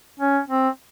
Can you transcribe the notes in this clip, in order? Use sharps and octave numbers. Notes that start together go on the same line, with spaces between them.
C#4
C4